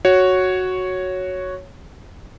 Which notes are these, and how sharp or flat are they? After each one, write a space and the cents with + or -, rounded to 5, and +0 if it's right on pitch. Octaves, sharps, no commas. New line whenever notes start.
F#4 +0 C#5 +0